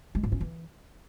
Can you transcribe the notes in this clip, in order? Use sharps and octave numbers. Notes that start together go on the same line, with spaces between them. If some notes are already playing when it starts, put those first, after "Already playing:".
G#3
G#2
C#4
E3